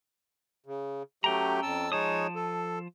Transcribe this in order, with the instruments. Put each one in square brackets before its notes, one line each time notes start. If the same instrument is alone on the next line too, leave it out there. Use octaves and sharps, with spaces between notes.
[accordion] C#3
[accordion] F#3 A3 G4 [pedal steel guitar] C#4 G5 A#5
[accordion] F2 A5 E6
[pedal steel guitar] F3 A5 D#6 [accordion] G#3 D#4 C#5
[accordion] A4